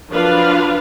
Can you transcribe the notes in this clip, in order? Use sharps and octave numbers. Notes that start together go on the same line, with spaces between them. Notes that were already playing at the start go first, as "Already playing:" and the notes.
F3 F#3 D4 F4 B4 F5